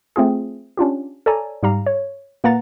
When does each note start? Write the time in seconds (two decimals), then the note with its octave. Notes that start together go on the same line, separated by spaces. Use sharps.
0.16 A3 C4 F4 G#4
0.77 C#4 D4 F4 G4
1.26 A4 C#5 D5 G#5 A#5
1.63 G#2 G3 G4 F5 A#5
1.86 C#5
2.44 A#2 A#3 B4 F#5 A#5 A6